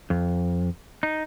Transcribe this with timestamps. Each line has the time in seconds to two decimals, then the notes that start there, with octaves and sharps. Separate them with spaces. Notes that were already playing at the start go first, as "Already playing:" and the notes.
0.10 F2
1.03 D#4